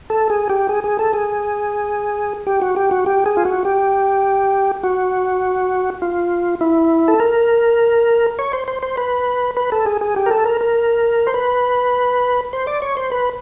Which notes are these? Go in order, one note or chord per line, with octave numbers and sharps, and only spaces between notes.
A4
G#4
G4
G#4
G#4
A4
G#4
G4
F#4
G4
F#4
G4
G#4
F4
F#4
G4
F#4
F4
E4
A4
A#4
C#5
C5
C5
C5
B4
B4
A4
G#4
G#4
G4
A#4
A4
A#4
A#4
C5
B4
C5
D5
C#5
C5
B4